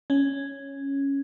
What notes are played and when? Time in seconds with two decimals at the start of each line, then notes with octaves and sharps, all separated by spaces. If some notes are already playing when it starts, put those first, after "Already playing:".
0.10 C#4